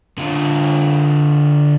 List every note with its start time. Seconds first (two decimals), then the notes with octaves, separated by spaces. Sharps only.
0.18 D3 F4